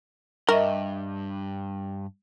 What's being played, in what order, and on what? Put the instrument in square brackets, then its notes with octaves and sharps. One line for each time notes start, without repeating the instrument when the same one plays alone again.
[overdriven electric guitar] G2 [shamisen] A#4 [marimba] D#5 E5 C#6